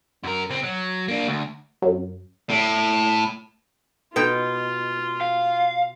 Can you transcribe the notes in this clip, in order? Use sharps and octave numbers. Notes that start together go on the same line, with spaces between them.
F#2 A#4
C#2 C4
F#3
A#3 D4
D2
F#2
A2
B2 D#4 F4 G5
F5